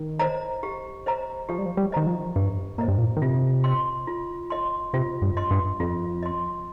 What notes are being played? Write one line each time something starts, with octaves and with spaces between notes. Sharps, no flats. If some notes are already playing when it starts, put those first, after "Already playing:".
Already playing: D#3
C5 D#5 A#5
G4
C5 D#5 A#5
F3 G4
G3
F3
G3
D#3 C5 D#5 A#5
F3
G2 G4
A#2 C5 D#5 A#5
G2
A#2
D#3
C3 F4
D#5 C6
F4
D#5 C6
C3 F4
G2
D#5 C6
G2
F2 F4
D#5 C6